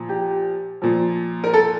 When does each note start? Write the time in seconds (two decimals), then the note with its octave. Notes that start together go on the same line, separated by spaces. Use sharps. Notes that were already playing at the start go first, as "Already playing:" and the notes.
Already playing: A#2 F3
0.09 G4
0.82 A#2 F3
1.44 A#4
1.54 A4